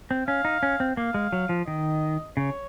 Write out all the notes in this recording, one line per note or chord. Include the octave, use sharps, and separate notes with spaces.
C4
C#4 F5
D#4
C#4
C4
A#3 F5
G#3
F#3
F3
D#3 D#5
C#3 C#5